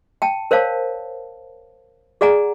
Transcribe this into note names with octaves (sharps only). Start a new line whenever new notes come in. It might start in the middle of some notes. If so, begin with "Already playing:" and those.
G5 A5
A#4 C5 C#5 F5 A5
G#4 D5 F#5 G#5 A#5